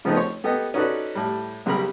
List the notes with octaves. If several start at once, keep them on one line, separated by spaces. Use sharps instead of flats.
C#3 F3 A3 B3 C4 D#4
C#5
B3 G4 A4 B4 D#5
C#4 D#4 F#4 A4 B4 D5
A2 G3
B1 C#3 G3 A#4 B5